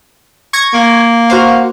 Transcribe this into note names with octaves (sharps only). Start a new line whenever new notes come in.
C#6 G#6 A#6
A#3
F#4 C5 F5